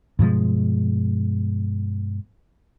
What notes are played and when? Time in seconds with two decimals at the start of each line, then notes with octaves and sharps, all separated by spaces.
0.19 G2 B2 F3 G#3